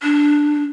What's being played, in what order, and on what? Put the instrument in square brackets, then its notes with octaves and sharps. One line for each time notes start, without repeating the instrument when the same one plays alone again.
[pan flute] D4